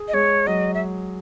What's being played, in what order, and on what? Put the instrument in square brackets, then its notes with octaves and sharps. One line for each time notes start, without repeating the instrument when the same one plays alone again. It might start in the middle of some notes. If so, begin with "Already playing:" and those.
Already playing: [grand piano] G#4
[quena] D#5
[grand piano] G#3 [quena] C#5
[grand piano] F#3 [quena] D#5
[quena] E5